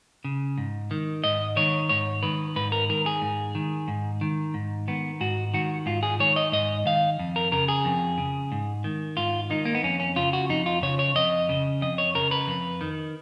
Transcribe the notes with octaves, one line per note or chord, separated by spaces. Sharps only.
C#3
G#2
D#3
G#2 D#5
D#3 C#5
G#2 C#5
D#3 B4
G#2 B4
A#4
D#3 A#4
G#4
G#2
D#3
G#2
D#3
G#2
D#3 B3
G#2 F#4
D#3 F#4
G#2 F4
G#4
D#3 C#5
D#5
G#2 D#5
D#3 F5
F2
A#4
C#3 A#4
G#4
F2
C#3
G#2
D#3
G#2 F4
D#3 D#4
A#3
B3
F2 C#4
C#4
C#3 F4
F#4
F2 D#4
F4
C#3 C#5
C#5
F2 D#5
C#3
F2 D#5
C#5
C#3 A#4
B4
F2
D#3